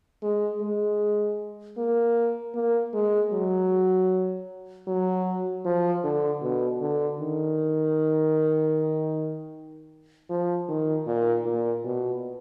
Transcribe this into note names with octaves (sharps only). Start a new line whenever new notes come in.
G#3
G#3
A#3
A#3
G#3
F#3
F#3
F3
D3
B2
D3
D#3
F3
D#3
A#2
A#2
B2